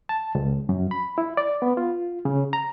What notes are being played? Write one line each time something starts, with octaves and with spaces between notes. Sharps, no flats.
A5
C#2
F#2
B5
E4
D5
B3
F4
C#3
A#5